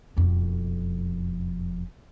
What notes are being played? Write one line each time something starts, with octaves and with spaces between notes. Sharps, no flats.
E1 F2